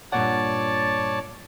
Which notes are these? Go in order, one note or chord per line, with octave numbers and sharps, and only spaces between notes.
G2 A#2 C#5 D5 F#5 A5